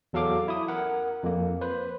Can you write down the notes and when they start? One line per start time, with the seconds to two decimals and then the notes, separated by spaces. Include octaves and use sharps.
0.13 E2 F#3 A4 F5 D6
0.48 E4 D#6
0.68 A#4 F#5
1.23 F2 A#3
1.61 B4 C5